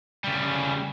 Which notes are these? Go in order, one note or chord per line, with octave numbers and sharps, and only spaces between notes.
C#3 G3